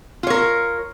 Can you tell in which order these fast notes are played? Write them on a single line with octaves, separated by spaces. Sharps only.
F4 C#5 A#4